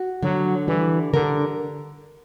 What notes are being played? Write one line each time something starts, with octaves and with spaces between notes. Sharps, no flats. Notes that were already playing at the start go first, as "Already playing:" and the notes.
Already playing: F#4
D3 F#3
E3 G3
D3 A#4